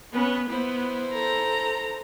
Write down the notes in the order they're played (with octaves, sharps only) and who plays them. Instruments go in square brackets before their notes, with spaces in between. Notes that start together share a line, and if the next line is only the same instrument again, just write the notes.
[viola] B3 [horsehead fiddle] C#4 B4
[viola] B3 [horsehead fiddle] E4 C5
[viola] A4 A#5